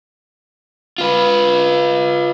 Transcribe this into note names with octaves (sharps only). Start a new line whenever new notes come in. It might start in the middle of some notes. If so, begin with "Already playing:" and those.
F4 B4